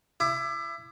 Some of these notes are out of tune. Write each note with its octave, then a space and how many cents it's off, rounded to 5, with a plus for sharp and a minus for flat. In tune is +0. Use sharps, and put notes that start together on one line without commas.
E4 +25 D6 +30